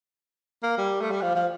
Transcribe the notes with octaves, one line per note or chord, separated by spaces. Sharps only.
A#3
G3
A3
G3
F3
F3